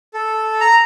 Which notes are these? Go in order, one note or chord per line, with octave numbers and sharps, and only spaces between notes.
A4
A#5